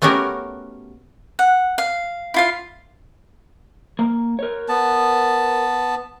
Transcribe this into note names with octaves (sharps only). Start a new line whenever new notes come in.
A3 B3 C#4 F#4 G4 A#4
F#5
F5
E4 F4 F5
A#3
A#4 C#5
B3 A5